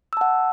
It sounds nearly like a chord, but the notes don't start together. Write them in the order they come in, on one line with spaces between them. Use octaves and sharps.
E6 A5 F#5